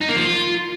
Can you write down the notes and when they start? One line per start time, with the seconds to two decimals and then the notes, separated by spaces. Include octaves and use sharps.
0.01 D#4
0.09 A#3
0.16 F3
0.24 F4